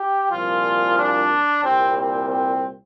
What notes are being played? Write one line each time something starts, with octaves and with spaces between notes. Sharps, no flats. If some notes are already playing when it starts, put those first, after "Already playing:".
Already playing: G4
C2 A#2 F3 F4
D4
C2 A#2 G3 C4
C4
C4